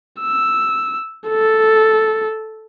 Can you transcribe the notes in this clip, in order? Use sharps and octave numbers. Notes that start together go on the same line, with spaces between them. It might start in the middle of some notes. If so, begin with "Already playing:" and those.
E6
A4